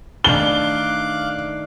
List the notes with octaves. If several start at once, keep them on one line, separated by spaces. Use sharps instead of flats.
D#3 A3 D4 F5 D6 F#6 G7